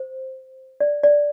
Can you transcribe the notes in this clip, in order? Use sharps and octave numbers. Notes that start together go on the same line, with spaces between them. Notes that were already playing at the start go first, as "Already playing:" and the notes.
Already playing: C5
D5
D5